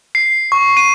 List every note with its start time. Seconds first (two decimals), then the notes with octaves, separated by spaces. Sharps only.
0.15 C7
0.52 C#6
0.77 D#7